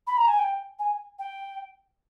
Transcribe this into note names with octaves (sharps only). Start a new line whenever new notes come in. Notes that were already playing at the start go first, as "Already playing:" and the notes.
B5
A#5
G#5
G5
G#5
G5